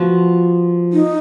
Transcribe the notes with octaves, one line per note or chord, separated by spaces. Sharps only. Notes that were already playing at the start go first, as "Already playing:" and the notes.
Already playing: F3 B3 F#4
D#4